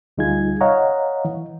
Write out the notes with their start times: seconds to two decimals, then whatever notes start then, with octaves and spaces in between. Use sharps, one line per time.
0.18 D2 G3 D#4 F4 G#4 G#6
0.61 C#5 D#5 F5 F#5 A#5
1.25 E3